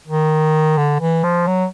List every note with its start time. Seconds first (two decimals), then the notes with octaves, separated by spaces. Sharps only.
0.08 D#3
0.78 D3
1.01 E3
1.24 F3
1.47 F#3